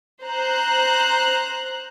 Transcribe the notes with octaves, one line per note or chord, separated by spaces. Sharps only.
C5 A#5 F#6